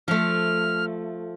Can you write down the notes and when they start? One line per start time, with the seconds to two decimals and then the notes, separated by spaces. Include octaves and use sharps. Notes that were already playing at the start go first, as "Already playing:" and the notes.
0.08 F3 A3 F6